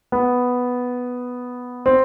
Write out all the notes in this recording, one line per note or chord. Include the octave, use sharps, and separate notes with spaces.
B3
C4